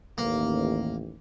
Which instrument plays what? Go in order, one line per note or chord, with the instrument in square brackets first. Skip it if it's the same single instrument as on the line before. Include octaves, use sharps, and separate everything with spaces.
[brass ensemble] A1 D#2 [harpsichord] A#3